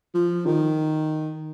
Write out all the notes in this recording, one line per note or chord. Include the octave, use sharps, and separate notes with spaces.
F3
D#3